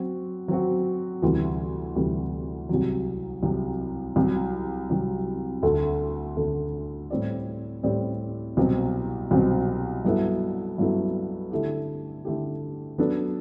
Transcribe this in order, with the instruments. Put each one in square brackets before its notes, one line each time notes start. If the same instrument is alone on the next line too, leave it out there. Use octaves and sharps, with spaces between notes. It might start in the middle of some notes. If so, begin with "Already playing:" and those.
Already playing: [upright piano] F#3 C4 F#4
F#3 C4 F#4
D2 C3 E3 G3
D2 C3 E3 G3
C2 C3 F#3
C2 C3 F#3
C2 C3 F#3
C2 C3 F#3
D2 D3 A3
D2 D3 A3
A2 G3 C4 G4 D5
A2 G3 C4 G4 D5
C2 B2 F#3 C4
C2 B2 F#3 C4
G2 F#3 B3 E4 A4
G2 F#3 B3 E4 A4
D3 A3 E4 G4
D3 A3 E4 G4
F#3 B3 D4 A4